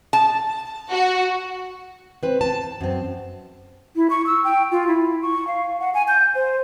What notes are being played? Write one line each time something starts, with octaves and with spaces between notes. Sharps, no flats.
A5
F#4
C4 B4
A5
F#2 C4
E4
C#6
E6
G5
F4
E4
C#6
F5
F#5
G#5
G6
C5